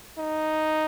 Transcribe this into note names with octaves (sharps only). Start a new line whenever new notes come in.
D#4